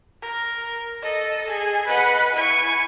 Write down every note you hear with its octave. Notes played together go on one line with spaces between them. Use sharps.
A#4
A4 D#5
G#4
B4 D#5 F#5
E4 G#5 C#6